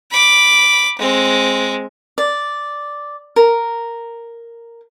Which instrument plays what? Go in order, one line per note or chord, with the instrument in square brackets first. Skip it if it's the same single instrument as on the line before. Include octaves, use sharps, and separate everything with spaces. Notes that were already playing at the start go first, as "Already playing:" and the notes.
[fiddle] B5 D6
G#3 C4
[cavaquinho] D5
A#4